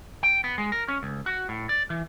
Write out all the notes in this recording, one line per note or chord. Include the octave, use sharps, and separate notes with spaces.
G5
B3
G#3
A#4
C#4
C#2
F#4
A2
D5
E3